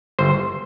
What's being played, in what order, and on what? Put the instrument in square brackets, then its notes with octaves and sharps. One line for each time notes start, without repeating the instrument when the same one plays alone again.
[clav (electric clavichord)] G1 C5